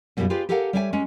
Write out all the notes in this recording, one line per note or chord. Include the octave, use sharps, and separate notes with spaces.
F#2 B2 G3 B3 E4 F4
F4 G4 G#4 B4 D5
G4 A4 A#4 F5 F#5 G#5
G3 C#5 D5 E5 F5 G#5
G#3 C#4